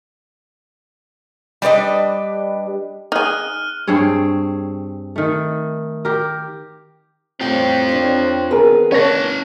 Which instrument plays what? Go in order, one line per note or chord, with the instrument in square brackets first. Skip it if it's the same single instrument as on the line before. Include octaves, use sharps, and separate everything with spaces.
[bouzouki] G3 D4 B4 D#5
[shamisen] D#4 G#4 [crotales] F6 F#6 D#7
[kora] G2 C4 G#4 C#5
D#3 A3
G4 A#4
[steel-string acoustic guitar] A2 G3 [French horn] C4 [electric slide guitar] F4 G5
[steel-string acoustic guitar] D4 C#5
[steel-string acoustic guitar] D#3 B3 B4 [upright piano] G#4 A#4
[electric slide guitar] C#4 A5 [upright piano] C#5 A#6